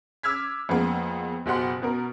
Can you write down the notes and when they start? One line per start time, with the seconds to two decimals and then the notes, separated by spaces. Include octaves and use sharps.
0.23 D6 E6 F6 G#6 B6
0.69 F2 G#3 A#3 B3
1.46 F#1 B2 G4 F#5 C6
1.82 B2 B3 A#4